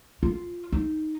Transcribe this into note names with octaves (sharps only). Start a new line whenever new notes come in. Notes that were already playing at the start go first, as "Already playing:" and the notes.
F4
D#4